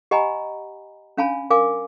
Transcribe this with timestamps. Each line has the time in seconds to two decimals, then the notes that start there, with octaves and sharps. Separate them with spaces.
0.11 G4 D#5 F#5 G#5 A#5 B5
1.17 C#4 D4 F5 G#5 A5 B5
1.50 A#4 F5 G#5 D6